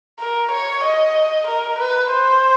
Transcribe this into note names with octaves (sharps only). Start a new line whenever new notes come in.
A#4
C#5
D#5
A#4
B4
C5